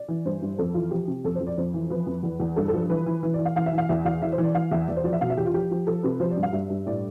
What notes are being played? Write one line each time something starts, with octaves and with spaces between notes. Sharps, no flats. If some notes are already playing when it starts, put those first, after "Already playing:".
Already playing: D5
E3
G2 C5
G2
F2 A4
E3 F4
F3 G4
C3
F2 A4
C5
F2
D5
F2 C5
E3
F3 B4
F2
E2
E2
G2 A4
A4
F3
E3 B4
E3
E3
D5
E3
F5
E3 F5
E5
E3 F5
E2 E5
E2 F5
E3 E5
C5
E3
D5
E3 F5
E2 E5
E2 D5
C5
F3 D5
E5
B2 F5
E5
E2 G4
F4
F3 G4
F3
F3 A4
C3 B4
F3 C5
D5
G2
F5
G2 E5
G2
A2 D5